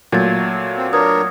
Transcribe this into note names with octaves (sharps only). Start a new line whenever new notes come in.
A#2 F#3 A3 G#6 A6
C4
D4 A#4 B4 C#5 D#6